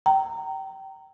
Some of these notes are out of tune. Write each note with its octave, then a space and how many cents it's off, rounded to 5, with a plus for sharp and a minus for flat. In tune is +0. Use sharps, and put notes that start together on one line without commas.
G5 -25 A#5 -20